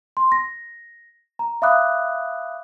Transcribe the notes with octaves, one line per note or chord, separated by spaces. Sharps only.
C6
A#6
A#5
E5 F5 B5 D6 D#6 F#6